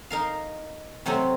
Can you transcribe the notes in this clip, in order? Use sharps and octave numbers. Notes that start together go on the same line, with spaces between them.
D#4 A#4 F5
C3 F#3 A3 C4